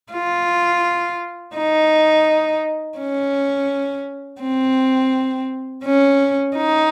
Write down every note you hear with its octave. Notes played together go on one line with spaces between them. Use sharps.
F4
D#4
C#4
C4
C#4
D#4